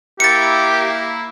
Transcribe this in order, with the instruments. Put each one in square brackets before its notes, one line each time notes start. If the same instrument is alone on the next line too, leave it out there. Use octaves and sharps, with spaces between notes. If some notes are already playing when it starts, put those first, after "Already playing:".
[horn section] A#3 E4 [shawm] G4 [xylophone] A6 C#7